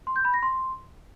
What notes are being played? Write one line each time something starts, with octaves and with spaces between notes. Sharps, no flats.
C6
G6
B5
A#6
C6